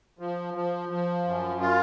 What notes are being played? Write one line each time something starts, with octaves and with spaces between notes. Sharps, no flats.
F3
F3
F3
F#2
F4